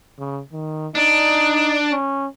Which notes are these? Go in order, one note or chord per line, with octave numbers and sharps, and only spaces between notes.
C#3
D#3
D4 D#4
C#4